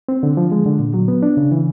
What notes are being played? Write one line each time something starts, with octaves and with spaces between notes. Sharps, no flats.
C4
D3
F3
G#3
D3
A#2
F#3
B3
D4
C#3
E3